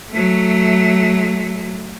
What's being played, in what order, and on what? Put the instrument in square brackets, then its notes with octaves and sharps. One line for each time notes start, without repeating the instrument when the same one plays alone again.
[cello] F#3 A3